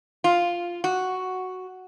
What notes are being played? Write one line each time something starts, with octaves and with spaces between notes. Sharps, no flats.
F4
F#4